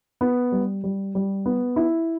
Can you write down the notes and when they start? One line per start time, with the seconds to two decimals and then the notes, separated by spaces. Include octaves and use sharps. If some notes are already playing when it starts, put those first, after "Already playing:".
0.21 B3
0.52 G3
0.84 G3
1.15 G3
1.46 B3
1.76 E4